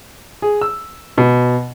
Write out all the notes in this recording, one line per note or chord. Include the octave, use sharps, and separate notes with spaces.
G#4
E6
B2